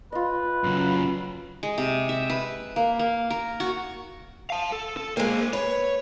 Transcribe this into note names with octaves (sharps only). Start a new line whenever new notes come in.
F4 B4 D#5
F#2 C#3
G#3
C3
E5
B4
A#3
A#3
A#4
F#4
F5 A5
A4
A4
G#3 A#3 A#4 C5
B4 C#5